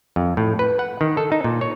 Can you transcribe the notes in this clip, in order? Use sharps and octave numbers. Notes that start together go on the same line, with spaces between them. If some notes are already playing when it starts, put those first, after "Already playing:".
F2
A2
B4
F#5
D#3
A4
D#4
A#2
C#5